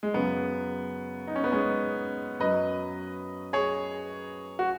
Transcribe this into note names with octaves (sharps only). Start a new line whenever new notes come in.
G#3
F#2 C#3 F#3 B3
D#4
C#4
B3
G#3 C#4
F#2 F#3 B4 D#5
G#4 C#5
F#4